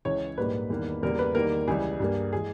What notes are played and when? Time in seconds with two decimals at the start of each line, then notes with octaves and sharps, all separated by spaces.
0.05 C#2 C#3 E3 C#5
0.38 A#1 G#2 G3 A#3 B4
0.70 E2 D#3 G3 A#3
1.03 E2 C#3 G3 A#3 A#4
1.19 B4
1.35 E2 D#3 G3 A#3 A#4
1.68 C#2 C#3 E3 G3 G#4
1.99 G2 G3 A#3
2.33 E3 G#3 G#4